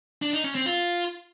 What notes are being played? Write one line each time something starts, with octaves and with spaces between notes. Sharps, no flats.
D4
D#4
C#4
C4
F4